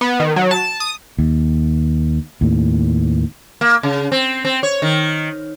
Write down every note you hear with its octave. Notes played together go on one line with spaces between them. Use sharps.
B3
D#3
F#3
A5
D#6
D#2
D#2 A2
A#3
C#3
C4
C4
C#5
D#3